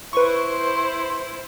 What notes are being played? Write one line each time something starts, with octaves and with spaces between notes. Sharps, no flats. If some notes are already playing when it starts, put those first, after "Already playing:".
E4 B4 C5 C6 C#6